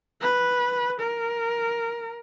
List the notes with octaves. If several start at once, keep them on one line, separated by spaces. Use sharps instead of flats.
B4
A#4